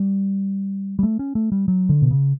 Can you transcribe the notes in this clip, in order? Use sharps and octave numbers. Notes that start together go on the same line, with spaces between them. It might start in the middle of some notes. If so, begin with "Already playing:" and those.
Already playing: G3
G3
A3
C#4
A3
G3
F#3
D3
B2
C#3